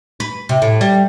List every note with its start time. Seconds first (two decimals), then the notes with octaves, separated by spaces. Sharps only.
0.20 B4
0.49 C3
0.62 A2
0.81 G3